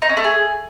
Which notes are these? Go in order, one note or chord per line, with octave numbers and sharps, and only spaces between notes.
D#4
C#4
A3
G#4